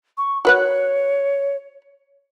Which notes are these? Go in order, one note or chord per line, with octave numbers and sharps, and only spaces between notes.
C#6
F#4 B4 C#5 F#5